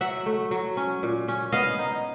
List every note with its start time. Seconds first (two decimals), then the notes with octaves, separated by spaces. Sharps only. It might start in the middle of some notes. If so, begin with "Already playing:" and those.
0.01 F#3 E5 F#5
0.26 A3
0.51 F#3
0.77 C#4
1.03 A#2
1.28 C#4
1.52 B3 D#5 F5
1.79 D#4